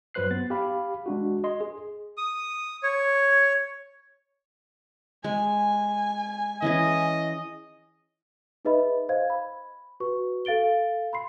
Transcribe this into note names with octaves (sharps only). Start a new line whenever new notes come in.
G2 F#3 B4 C5 F#6 C7
B3 A6
G4 F5 B5
G#3 D4 F#4
D#5 C6
G#4
D#6
C#5
G#3 G#5
E3 C#4 G#4 D#5
D#4 G#4 B4 D#5 E5 B5
C5 D#5 F5 G#6
B5
F#4 B4 C#6
A4 F5 A6 D7 G7
B5 C6 C7